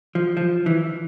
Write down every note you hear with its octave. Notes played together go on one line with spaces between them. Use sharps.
F3
F3
E3